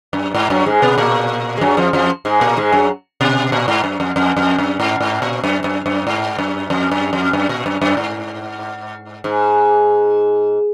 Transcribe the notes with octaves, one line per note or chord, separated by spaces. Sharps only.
F#2
G#2
F#2 F#3
G#2 G#3
B2 B3
A#2 A#3
G#3
F#2 F#3
F2 F3
F2 F3
G#2 G#3
A#2 A#3
G#2 G#3
F#2 F#3
B2
A#2
G#2
F#2
F2
F2
F2
F#2
G#2
G#2
A#2
F#2
F#2
F#2
G#2
F#2
F2
F#2
F2
F#2
A#2
F#2
F#2
G#2
G#2